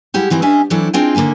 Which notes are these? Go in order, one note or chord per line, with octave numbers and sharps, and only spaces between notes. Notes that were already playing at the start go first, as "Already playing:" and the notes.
G3 G#3 E4 G4 F#5
D#3 E3 C4 D#4 E4
C#4 D4 D#5 E5 G#5
E3 F#3 C4 D4 E4 A4
C4 D4 F4 G#4 D#5 G5
D#2 D3 A#3 E5 G#5